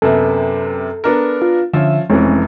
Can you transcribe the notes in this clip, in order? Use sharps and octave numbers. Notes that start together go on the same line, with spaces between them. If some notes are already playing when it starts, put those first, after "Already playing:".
F#2 C3 B3 A4
B3 D4 A#4
F4
D3 F3 C#4 E5
F1 E3 G#3 C4 C#4